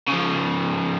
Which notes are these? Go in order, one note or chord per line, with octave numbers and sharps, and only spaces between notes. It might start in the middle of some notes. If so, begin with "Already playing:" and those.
C#3 F3